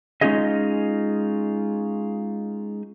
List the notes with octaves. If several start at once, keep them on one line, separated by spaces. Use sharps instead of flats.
G#3 C#4 D#4 F4 G#4 D#5